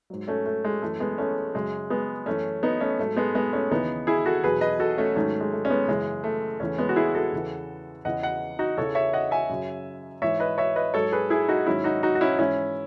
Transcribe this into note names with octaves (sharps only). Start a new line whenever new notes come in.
G#2 F#3
A3 C#4
A3
G#3
F#2 E3 A3
G#3 B3
A3 C#4
F#2 C#3 F#3 G#3
G#3 B3
F#2 E3 A3 C#4
B3 D#4
A3 C#4
G#2 F#3 A3
G#3 B3
G#3 B3
A3 C#4
D#2 C#3 E3 B3 D#4
E4 G#4
F#4 A4
E2 B2 F#3 G#4 B4
B4 D#5
F#4 A4
A3 C#4
G#2 D#3 F#3 A3 C#4
G#3
A3
C#4
G#3 B3
F#2 C#3 E3 G#3
A3
E2 C#3 E3 A3 C#4
G#3 B3
F#4
E4 G#4
F#4 A4
E2 C#3 E3
E2 C#3 E3 D#5 F#5
D#5 F#5
D#4 F#4
E2 C#3 E3 A4 C#5
C#5 E5
D#5 F#5
E5 G#5
F#2 C#3 F#3
G#2 E3 C#5 E5
B4 D#5
C#5 E5
B4 D#5
G#2 F#3 A4 C#5
G#4 B4
E4 G#4
D#4 F#4
G#2 D#3 F#3 C#4 E4
D#4 F#4
D#4 F#4
F#4
C#4 E4
G#2 E3 C#4 E4